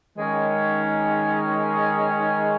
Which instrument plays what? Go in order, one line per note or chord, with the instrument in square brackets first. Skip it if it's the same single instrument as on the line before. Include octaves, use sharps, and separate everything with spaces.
[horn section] D#3 G#3 C#4